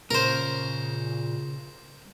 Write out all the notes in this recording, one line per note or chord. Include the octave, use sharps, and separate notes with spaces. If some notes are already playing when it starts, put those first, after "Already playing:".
A#2 C#3 A#4 C5